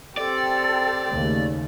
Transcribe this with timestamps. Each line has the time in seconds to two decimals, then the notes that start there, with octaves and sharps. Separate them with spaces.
0.17 C4 G4 A4 D5
1.12 D#2 C#3 A3